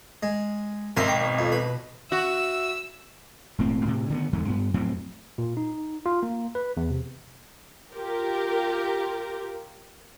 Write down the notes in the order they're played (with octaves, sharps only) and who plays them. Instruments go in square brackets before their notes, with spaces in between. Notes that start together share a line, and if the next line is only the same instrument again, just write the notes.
[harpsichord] G#3
[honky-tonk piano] G#1 [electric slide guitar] B2 D#5 [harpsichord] A#4 C5 E5
[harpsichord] G5
F2
B4
[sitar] F#4 [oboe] E5 [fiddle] E6
[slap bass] E1 A2 C4
A2 C3
D3 D#3 G#3 B3
E2 G#2 D3
G2 B3
F2 A2 F#3 C4
[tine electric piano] A#2
D#4
F4
A#3
B4
E2
C3
[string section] F4 G4 A#4